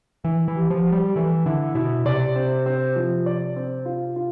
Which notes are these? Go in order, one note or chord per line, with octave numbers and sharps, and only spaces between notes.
E3 E4
E3
G4
F3
G4
G3
E3 A3
D3 E4
B2 E4
C3 D5
C4
C4
F3
D5
C4
F4
F4